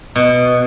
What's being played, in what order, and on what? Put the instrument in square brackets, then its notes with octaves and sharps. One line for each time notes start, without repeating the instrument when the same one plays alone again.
[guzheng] B2